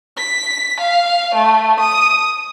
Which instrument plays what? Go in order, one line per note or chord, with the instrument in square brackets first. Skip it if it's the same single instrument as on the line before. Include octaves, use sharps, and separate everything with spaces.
[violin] B6
F5
A3
D#6